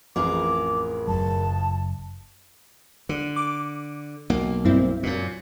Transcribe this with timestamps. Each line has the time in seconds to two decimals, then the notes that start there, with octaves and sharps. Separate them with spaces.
0.16 A1 F2 A2 G#4 A#4 D6
1.08 F#1 F#2 F#3 A5
3.09 D3
3.36 D6
4.30 B1 A#3
4.65 G2 C4 E4
5.03 F#2 A#2